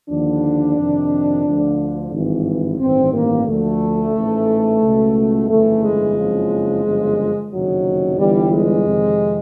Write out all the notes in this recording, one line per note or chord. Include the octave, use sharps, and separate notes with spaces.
D#2 D3 F3 D4
F2 C3 D#3
D2 D3 F3
G#1 G2 E3
A1 G2 D#3 C4
A#3
D2 D3 F3 A3
A1 G#2 E3
C#2 B2
G1 F2 C#3 E3 A3
G#3
F#1 F2 C#3 F3
G1 F#2 C#3 F3
F#1 F2 C3 D#3 F#3
G1 G2 E3 G3
G#3
F2 C3 D#3